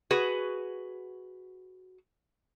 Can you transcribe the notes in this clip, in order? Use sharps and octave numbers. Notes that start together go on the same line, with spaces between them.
F#4 G#4 B4